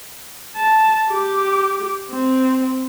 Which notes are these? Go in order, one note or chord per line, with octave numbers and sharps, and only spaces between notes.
A5
G4 D6
C4